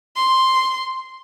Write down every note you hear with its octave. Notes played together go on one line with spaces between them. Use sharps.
C6